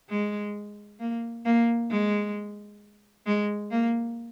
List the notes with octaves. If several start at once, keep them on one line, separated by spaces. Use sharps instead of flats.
G#3
A#3
A#3
G#3
G#3
A#3